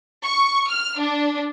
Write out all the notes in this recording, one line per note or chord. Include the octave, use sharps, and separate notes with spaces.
C#6
F6
D4